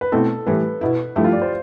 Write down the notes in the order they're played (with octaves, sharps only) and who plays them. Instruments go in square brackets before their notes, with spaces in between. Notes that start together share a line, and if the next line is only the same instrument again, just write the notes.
[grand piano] B4
[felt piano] B2 A3 C4 E4 [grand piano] A4
[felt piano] A2 E3 G3 [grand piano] B4
[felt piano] B2 B3 E4
[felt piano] G2 F3 A3 E4 [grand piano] G4
[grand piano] F4
D5
C5